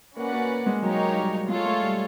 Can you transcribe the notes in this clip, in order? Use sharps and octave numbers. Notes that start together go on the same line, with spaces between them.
A#3 C#4 F#4 B4 D5 F#5
A#3
G#3
F#3 A#3 D#4 G4 A#4 C#5
G3
G#3 F4 A4 C#5
A3
G3